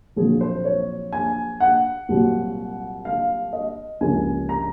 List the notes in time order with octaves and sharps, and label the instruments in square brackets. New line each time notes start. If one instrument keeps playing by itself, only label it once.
[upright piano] A#1 A#2 F#3 C4 G#4
C5
C#5
G#5
F#5
C2 A#2 F#3
F5
D#5
C#2 C3 F3 A#3 C#4 G#5
A#5